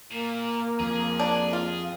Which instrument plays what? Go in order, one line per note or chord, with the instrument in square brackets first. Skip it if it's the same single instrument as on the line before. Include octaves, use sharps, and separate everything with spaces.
[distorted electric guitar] A#2 [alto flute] A#3
[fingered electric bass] F2 [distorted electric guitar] G#4
[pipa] D4
F4